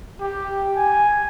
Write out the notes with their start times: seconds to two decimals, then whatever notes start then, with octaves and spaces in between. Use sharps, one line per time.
0.20 G4
0.77 G#5